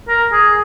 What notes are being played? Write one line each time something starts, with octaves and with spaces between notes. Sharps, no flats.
A#4
G#4